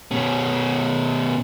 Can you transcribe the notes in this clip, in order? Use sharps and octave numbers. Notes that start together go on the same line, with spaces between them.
B2 C#4